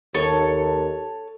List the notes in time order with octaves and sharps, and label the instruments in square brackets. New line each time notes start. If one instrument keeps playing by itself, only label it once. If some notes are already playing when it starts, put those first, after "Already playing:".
[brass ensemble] D#2 [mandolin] A4 C#5